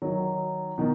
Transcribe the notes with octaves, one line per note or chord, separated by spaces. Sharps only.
D#3 F#3
B2 D#3